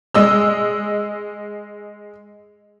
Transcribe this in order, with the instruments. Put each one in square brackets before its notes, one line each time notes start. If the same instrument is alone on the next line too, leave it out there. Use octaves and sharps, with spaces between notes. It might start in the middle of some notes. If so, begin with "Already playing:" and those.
[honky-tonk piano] G#3 D#5 E6